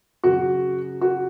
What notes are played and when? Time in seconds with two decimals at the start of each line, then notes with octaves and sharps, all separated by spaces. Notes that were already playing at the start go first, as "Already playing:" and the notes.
0.24 F#2 C#3 F#4
1.01 F#4